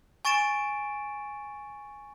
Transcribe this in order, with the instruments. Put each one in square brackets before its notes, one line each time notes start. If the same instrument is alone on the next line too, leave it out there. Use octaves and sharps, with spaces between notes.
[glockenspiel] G#5 C#6 A6 D7 E7